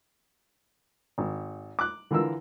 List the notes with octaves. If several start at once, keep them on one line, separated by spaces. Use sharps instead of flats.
G#1
D6 F#6
D3 E3 F4 A#4 E6